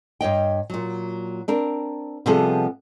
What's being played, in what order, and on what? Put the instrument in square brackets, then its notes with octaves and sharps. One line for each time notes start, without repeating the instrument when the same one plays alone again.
[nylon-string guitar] G2 C#5 D#5 G5
A#2 F#3
C4 D4 A#4
C3 F3 G3 B3 G#4 A4